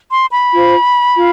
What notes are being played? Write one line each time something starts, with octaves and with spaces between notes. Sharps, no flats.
C6
B5
F4 C5
F4